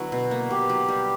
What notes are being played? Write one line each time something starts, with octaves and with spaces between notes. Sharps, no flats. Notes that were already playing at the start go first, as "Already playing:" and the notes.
Already playing: D3 F#3 B3 E4 F#4
B2
A#3
B2 G4
F#3
G3